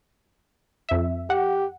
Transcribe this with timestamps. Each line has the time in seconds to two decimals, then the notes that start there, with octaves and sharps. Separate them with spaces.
0.89 F2 E5
1.30 G4 F#5